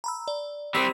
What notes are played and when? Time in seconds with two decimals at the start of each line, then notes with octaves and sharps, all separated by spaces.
0.04 A#5 B5 E6
0.28 D5
0.75 G3 C4 E6 B6